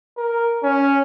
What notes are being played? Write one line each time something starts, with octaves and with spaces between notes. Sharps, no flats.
A#4
C#4